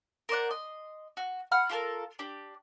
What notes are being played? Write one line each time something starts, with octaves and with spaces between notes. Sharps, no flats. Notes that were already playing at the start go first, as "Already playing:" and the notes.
A#4 C5 D5 F#5
D#5 C6
F#4
F#5 B5 F6
F4 G4 A4 A#4
D4 G4